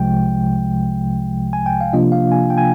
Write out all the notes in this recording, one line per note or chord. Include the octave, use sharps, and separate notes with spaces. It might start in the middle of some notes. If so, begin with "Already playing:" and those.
Already playing: C2 C3 F3 G#3 G5
G#5
G5
F5
C3 F3 A#3 D4 F4 D#5
F5
G#5
G5
G#5